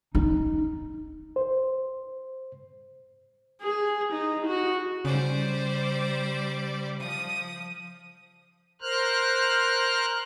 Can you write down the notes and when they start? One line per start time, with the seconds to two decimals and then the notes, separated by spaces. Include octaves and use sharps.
0.15 D#4
1.36 C5
3.63 G#4
4.13 D#4
4.47 F#4
5.05 C#3 G3 C5 D5
6.99 F3 D#6
8.82 A#4 C5 F6 F#6